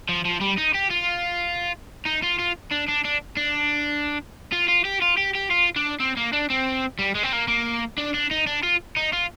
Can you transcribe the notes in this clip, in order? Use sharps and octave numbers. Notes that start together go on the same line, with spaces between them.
F3
F3
G3
D#4
G4
F4
D#4
F4
F4
D4
D4
D4
D4
F4
F4
G4
F4
G4
G4
F4
D4
C4
A#3
D4
C4
G3
G#3
C4
A#3
A#3
D4
D4
D#4
D4
F4
D#4
F4